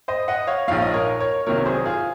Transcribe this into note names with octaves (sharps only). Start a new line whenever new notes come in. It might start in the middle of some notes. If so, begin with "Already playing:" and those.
C5 D#5
D#5 F#5
C#5 F5
A#1 G#2 F3 C#5 F5
D#5
A#4 C#5
A#4 C#5
C2 C3 D#3 F#3 A#4 C#5
G#4 C5
F4 G#4